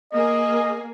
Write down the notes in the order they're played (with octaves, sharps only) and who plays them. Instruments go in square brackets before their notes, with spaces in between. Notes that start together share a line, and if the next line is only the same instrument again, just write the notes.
[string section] A#3 G#4 [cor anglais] D#5